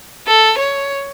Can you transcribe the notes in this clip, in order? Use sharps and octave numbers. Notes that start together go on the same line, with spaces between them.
A4
C#5